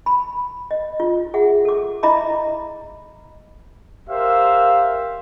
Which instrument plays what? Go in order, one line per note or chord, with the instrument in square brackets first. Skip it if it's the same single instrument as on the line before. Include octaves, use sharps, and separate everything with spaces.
[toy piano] B5
D#5
F4
G#4 E5 F#5
A4 D6
E4 D#5 E5 A#5 B5 D6
[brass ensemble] G4 A#4 C5 E5 F5